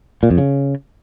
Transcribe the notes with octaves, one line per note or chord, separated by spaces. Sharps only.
A#2
F2
C#3